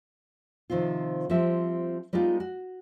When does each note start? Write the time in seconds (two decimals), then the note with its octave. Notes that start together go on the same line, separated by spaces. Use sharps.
0.70 C3 D#3 F3 C4 F4
1.30 F3 G3 C4 E5
2.13 G3 G#3 B3 D#4 F4
2.40 F#4